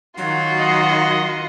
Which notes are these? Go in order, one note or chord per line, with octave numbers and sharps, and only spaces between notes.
D#3 F#3 F4 F#4
D#5 F#5